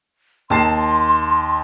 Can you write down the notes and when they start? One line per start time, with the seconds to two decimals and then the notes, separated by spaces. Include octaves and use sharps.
0.50 D#2 A5 C6 C7